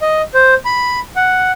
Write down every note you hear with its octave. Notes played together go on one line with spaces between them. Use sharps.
D#5
C5
B5
F#5